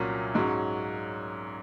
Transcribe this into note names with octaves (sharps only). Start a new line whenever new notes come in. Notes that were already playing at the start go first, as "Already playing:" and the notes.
Already playing: C2 A#2 F#3 C#4
G#2 F#3 C#4